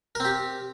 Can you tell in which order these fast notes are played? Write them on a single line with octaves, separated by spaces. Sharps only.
A#4 C4 G4